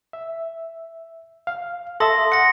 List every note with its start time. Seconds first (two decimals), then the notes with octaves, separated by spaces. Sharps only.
0.13 E5
1.47 F5
2.00 A4 E5 C6 D#6 A#6
2.32 F#5 A#6 C#7